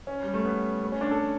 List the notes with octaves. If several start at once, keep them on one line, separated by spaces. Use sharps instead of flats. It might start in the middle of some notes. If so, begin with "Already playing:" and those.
C#4
G3
A3
B3
A3
C#4
D4
A4